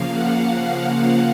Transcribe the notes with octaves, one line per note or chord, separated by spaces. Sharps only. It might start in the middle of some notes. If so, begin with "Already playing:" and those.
Already playing: C#3 F3 A#3 F5
F#5
F#5